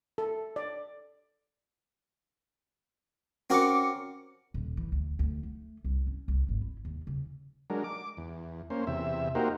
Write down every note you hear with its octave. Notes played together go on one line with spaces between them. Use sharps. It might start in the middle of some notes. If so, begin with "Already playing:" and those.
A4
D5
C4 C#4 F#4 A#4 D6 C#7
D#1
E3
D2
D2
A3
C2
C#4
C2
G#1
E4
D#2
C#3
F#3 G#3 D4 A#4
D6
E2
A#3 C#4 C5
E2 C3 E5
A#3 D#4 F#4 G4 A#4 C5